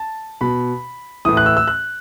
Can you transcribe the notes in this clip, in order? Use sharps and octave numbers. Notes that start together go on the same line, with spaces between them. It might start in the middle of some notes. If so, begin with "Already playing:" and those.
Already playing: A5
B2 B5
A2 E3 D#6
F#6
E6
E6
F#6